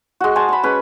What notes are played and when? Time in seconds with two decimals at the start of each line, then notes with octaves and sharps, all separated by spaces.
0.20 G#3 F#4
0.36 C5 G#5 A5
0.49 A5 B5
0.63 G#3 C#4 B4